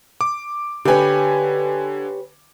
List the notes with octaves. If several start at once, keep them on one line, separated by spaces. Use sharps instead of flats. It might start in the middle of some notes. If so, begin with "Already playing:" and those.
D6
D3 G4 B4 C#5 G#5